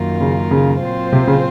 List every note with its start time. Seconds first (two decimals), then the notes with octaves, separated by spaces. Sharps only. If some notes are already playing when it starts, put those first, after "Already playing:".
Already playing: F#2 D#3 A#3 F4 A#4
0.21 C#3
0.51 C#3
0.82 A#2 F#3 C4 F4 C5
1.12 C3
1.27 C#3